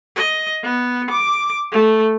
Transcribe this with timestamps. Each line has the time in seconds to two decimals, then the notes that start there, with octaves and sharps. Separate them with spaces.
0.16 D#5
0.64 B3
1.11 D6
1.72 A3